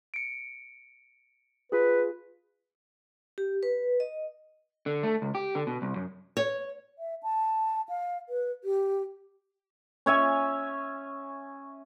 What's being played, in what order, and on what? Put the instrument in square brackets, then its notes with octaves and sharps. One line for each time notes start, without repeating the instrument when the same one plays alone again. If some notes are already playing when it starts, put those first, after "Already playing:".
[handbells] C#7 D7
[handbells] F4 G#4 [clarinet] B4
[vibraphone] G4
B4
D#5
[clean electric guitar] D3
A3
C#2
G4
D3
B2
C2
F#2
[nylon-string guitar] C#5
[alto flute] E5
A5
F5
B4
G4
[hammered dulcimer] C#4 C#5 E5 G#5